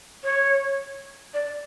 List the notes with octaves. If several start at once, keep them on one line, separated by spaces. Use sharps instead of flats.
C#5
D5